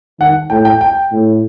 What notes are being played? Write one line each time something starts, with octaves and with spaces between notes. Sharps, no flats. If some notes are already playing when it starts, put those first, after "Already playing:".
D#3 F#5
A2 G5
G5
G5
A2